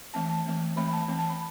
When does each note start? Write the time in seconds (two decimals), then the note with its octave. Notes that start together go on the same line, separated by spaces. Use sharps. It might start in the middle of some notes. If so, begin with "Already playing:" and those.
0.14 E3 A3 C4 A5
0.29 A5
0.46 E3 A3 C4
0.76 E3 A3 C4 B5
0.93 A5
1.08 E3 A3 C4
1.19 A5
1.30 B5